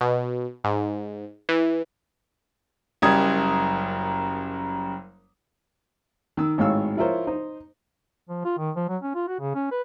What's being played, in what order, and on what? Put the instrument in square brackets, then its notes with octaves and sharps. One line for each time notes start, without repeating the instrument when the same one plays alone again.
[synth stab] B2
G#2
E3
[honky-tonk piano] F#1 F#2 G3 D#6 G#6
[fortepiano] D#3 E6
G#1 A2 G#3 C#5 F5 E6
F3 E4 F4 A#4 C5 C#5
D#4 C5
[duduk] F3
F4
D#3
F3
F#3
C#4
F4
F#4
C#3
C#4
B4